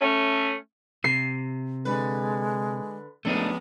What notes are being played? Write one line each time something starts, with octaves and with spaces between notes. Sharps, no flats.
A3 C#4
C3 C7
D3 G#3 B4
F2 G#3 A3 B3 D4 D#4